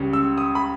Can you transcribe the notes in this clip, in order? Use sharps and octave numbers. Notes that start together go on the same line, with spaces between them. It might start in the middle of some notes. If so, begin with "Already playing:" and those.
Already playing: C#2 C#3 G3 C#4
E6
D#6
B5